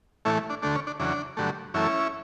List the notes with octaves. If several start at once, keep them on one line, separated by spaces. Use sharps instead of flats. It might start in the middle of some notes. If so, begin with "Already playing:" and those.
A2 E3 A3 C#4 E4
D4
D2 D3 A3 D4
C#4
D4
E2 C#3 F#3 D4
G2 D3 F#3 A3
F#2 E3 A3 C#4 E4